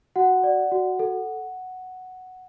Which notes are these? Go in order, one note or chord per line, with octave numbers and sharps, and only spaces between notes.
F#4 F#5
D5
F#4
A4